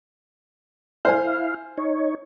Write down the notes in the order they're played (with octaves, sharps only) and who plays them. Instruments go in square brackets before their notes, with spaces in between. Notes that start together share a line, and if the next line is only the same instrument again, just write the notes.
[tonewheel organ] E4 F5 [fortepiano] C5 G#5
[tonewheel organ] D#4 C#5